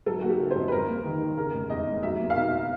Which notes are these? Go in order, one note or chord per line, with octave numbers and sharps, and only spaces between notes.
F#3 A4
F#4
A#3
G4
C#3
C5
F2
B4
G3 A#4
A#3
D#3
D#2
C#3 A#4
F1
E2 D#5
F1
F#3 E5
A#3
F5
B2 E5